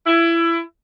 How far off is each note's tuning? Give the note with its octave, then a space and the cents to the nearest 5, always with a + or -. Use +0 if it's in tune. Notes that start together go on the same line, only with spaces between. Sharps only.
E4 +25